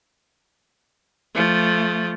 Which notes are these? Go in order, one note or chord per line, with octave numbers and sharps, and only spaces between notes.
F3 A3